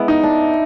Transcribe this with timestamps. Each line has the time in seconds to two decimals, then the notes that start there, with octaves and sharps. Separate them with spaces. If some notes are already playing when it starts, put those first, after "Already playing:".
Already playing: G#3 B3 E4
0.08 D#4
0.23 D4